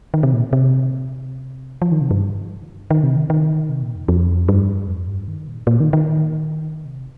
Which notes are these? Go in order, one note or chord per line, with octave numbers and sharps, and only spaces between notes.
D#3
C3
A#2
C3
F3
D#3
C3
G2
D#3
C3
D#3
D#3
C3
A#2
F2
F2
G2
F2
G2
D#3
A#2
A#2
D#3
D#3
C3